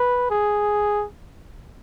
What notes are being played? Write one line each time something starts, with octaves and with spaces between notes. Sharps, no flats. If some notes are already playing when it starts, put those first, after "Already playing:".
Already playing: B4
G#4